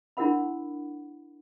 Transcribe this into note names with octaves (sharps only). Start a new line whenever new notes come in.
D4 E4 F#4 A#4 F#5 B5